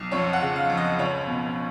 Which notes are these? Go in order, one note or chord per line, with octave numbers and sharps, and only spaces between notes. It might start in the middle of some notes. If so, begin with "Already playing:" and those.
Already playing: B1
F2 C#5
F#5
C#3
F5
F2
D#5
C#2 C#5
B2